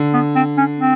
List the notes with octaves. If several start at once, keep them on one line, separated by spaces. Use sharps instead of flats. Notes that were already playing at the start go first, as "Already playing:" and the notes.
Already playing: D3
B3
C4
C#4
C4